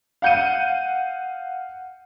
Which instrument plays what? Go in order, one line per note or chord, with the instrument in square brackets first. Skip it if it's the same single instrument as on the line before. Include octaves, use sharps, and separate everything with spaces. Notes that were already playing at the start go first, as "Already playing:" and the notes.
[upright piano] F5 F#5 G6 C#7 D#7